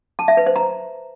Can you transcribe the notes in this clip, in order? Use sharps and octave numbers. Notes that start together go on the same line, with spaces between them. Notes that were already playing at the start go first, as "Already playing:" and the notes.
A5
E5
B4
C5
A#5